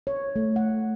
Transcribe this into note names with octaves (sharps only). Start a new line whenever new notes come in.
C#5
A3
F#5